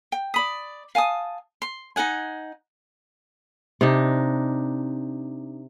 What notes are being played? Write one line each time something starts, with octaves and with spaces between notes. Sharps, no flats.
G5
D5 B5 D#6
F5 G#5 A5 D#6
C6
D#4 G#4 F#5 G#5
C3 D4 D#4